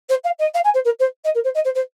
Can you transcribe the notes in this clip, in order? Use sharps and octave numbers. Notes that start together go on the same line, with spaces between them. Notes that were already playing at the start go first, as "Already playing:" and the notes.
C5
F5
D#5
F5
G#5
C5
A#4
C5
D#5
A#4
C5
D#5
C5
C5